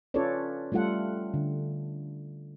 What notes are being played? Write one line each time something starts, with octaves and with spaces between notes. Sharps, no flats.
C#4 F4 A4 B4 C#5 D5
G3 A3 F4 A4 F#5
D3